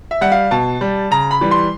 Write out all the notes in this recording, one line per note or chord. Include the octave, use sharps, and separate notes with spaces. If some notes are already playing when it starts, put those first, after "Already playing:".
E5
G3 F#5
F5
B2 A5
G3
C#3 A#5
B5
E3 G3
C6